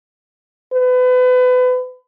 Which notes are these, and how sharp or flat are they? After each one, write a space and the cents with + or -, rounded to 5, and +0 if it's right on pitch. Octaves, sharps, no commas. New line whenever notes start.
B4 +30